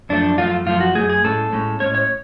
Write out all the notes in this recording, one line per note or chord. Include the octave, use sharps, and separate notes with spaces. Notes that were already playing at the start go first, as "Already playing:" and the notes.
F#2 F3 A3 D4
F#2 F3 A3 F4
F#2 F3 A3 F4
F#4
F#2 F3 A3 G#4
G#4
A2 G#3 C#4 A4
A2 G#3 C#4
A2 G#3 C#4 C#5
C#5